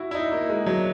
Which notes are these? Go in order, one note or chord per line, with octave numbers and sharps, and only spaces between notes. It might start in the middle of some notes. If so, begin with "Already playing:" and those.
Already playing: E4 F#4
E4
D#4
A#3
G#3
F#3